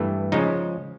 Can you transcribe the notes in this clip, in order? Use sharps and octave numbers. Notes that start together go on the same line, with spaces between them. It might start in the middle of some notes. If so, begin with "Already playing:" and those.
Already playing: G2 E3 A3
C#3 F3 G#3 D#4